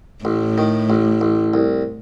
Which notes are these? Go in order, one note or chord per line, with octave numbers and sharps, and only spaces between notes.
A1 A2
D#3
A1
A1
C2